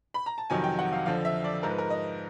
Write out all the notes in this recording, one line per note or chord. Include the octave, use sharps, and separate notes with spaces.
B5
A#5
A5
F2 C3 D#3 F#3 G#5
G5
F#5
F5
F2 D3 F3 F5
E5
D5
G#2 F3 A#4
B4
A#4
D#5